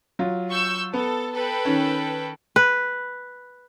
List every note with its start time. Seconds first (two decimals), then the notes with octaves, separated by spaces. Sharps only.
0.19 F#3 F4
0.50 C#6 E6 G6
0.94 B3 A4
1.33 A4 B4 G5
1.65 D#3 C#4
2.56 B4